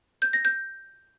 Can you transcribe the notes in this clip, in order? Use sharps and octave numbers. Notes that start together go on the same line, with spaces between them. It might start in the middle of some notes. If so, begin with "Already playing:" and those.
G6
A#6
G6